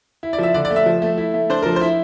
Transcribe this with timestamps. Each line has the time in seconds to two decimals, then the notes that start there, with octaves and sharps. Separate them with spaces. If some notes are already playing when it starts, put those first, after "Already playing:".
0.23 E4
0.33 D5
0.38 F3 E5
0.54 D3 D5
0.65 D5
0.70 A3
0.76 E5
0.86 F3
1.02 A3
1.18 E4
1.34 A3
1.50 D4 C5
1.62 F3 A#4
1.76 C5
1.81 E4